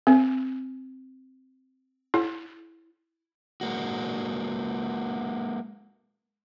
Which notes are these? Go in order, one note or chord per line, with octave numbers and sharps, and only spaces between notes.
C4
E4
G#3 A#3 F#4